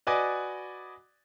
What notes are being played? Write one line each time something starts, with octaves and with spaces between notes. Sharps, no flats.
F#4 B4 D5 D#5 G#5 D6